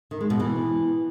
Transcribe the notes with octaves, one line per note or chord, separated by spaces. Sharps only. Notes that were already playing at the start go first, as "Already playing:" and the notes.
D#3
G#3
B2
E3